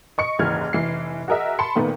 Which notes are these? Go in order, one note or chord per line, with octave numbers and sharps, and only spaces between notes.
D#5 C#6 C#7
F#1 D#2 G#2 E3 F6 G#6
F1 E3 C7
F#4 G#4 A#4 D#5 E5
A5 B5 C6 C#7
A#2 D#3 A3 B3